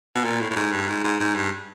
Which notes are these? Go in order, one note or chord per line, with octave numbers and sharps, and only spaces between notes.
B2
A#2
A2
A2
G#2
G2
G#2
G#2
G#2
G2